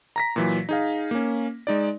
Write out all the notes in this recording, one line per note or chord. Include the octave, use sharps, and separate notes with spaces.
A#5 A#6 B6
A#2 E3 F#3
D#4 G#4 F5
A#3 C#4
G#3 D#4 D5